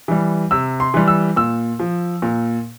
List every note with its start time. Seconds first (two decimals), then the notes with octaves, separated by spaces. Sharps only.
0.08 E3 G3
0.51 C3 E6
0.80 C6
0.94 E3 G3
1.08 E6
1.36 A#2 E6
1.79 F3
2.22 A#2